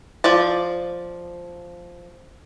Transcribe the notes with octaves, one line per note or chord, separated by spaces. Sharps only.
F3 D5 A5